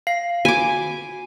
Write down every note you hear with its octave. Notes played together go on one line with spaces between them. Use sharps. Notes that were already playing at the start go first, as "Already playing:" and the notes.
F5 C7
F#4 G#5 D6